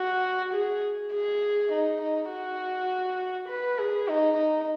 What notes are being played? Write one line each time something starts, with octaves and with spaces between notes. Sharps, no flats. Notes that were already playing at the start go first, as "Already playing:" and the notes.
Already playing: F#4
G#4
G#4
D#4
D#4
F#4
B4
G#4
D#4
D#4